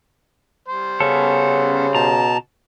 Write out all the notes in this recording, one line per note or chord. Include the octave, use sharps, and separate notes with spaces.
G3 C5
C#3 B3 C#4 A4
B2 A5 A#5